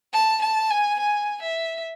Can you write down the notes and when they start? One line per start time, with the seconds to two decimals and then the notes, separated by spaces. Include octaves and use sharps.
0.13 A5
0.42 A5
0.70 G#5
0.99 G#5
1.42 E5